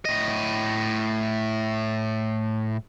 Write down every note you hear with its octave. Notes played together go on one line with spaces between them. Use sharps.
A2 D#5